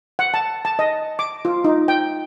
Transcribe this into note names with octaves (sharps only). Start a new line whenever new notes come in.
F#5
A5
A5
D#5
D6
F4
D#4
G5